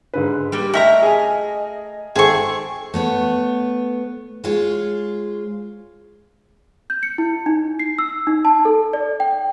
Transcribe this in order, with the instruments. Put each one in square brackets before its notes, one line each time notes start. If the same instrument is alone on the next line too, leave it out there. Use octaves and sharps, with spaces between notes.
[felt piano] G#2 D3 B4
[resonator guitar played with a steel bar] G3 A#3 [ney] G4
[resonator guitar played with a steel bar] A3 E5 A#5 [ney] D#5 [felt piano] G5 F6 A#6
[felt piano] G#4 G#5
[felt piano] G#1 A4 C5 [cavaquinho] G#4 C#6 [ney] G5
[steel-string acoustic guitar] A3 B3 C#5
G#3 F4 C#5
[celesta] G6
C#7
E4
D#4
C7
E6
D#4
A5
A4
D5
G5